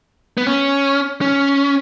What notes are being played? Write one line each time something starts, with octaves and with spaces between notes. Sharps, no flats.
B3
C#4
C#4